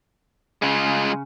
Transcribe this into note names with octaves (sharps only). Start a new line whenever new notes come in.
C#3 G#3 F4